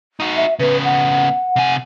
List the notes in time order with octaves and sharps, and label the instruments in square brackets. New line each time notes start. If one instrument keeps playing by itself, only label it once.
[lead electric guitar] D#4 F#4
[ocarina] E5
[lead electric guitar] C#3 B3 [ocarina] B4
[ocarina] F#5
[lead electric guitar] C3 G#5